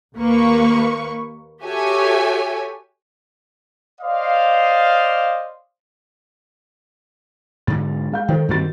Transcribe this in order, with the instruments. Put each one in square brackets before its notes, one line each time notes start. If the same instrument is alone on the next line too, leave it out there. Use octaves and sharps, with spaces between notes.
[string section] D#2 A#3 B4 C#6
F#4 G4 A4 C#5 E5 G#5
[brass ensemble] C5 D5 D#5 F5
[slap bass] G#2 D3 [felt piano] A6
[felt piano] G#3 F5 G6
[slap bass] D#3 [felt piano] A4 C5 G5
[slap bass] G2 G3 C4 [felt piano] D#3 F#4 A6